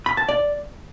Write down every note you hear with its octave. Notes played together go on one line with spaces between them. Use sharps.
B5
A5
D5